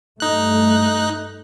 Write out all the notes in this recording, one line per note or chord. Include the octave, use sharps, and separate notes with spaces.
G2 A3 D#4 F#6